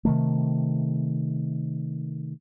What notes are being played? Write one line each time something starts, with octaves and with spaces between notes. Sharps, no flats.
C3 D#3 A3